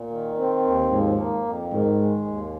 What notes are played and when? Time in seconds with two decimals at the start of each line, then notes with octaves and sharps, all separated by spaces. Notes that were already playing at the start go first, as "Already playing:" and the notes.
Already playing: A#2
0.10 D#3
0.37 C4
0.64 D#2
0.91 G#2 F3
1.18 A#3
1.45 F2
1.71 G#2 D#3
1.99 G#3
2.26 D#2